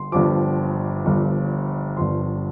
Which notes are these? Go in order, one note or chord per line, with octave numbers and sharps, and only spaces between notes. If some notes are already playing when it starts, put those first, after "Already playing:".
Already playing: G1 G2 C6
G1 G2 F3 D6
G1 G2 F3
G1 G2 F3 C6